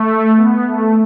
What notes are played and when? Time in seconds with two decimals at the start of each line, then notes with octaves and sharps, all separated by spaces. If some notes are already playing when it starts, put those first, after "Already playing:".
Already playing: A3
0.37 B3
0.68 A3